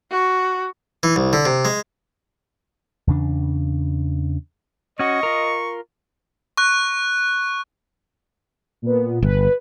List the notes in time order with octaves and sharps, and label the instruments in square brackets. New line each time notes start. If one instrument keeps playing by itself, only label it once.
[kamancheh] F#4
[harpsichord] E3
C2
D3
C3
G#3
[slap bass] E2 C#3 D4
[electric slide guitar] C#4 F#4 [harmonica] D#5 [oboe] C#6
[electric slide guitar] F4 A#4
[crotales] C#6 F#6
[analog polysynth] A#2 B3
[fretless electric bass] G1 [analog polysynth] B4